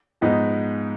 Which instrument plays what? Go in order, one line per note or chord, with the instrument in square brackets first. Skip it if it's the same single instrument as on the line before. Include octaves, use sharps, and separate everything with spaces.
[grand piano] G#2 F3 G#3 B3 D#4